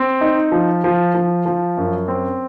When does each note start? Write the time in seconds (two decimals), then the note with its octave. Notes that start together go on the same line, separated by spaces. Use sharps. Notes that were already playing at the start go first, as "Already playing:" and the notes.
Already playing: C4
0.21 D#4
0.52 F3
0.84 F3
1.14 F3
1.46 F3
1.77 F#2
2.08 C4